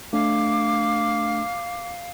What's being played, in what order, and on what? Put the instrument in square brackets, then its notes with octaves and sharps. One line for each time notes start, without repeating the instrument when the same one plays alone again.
[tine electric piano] A3 D4 [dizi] F5 [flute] D6